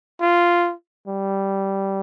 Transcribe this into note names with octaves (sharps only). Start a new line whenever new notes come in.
F4
G3